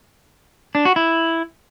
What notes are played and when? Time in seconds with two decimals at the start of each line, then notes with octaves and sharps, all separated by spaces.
0.75 D4
0.85 F#4
0.96 E4